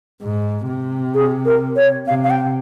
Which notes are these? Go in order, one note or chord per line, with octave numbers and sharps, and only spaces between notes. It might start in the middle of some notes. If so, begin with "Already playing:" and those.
G#2
C3
G#4
A#4
C#5
C3 F5
F5
G5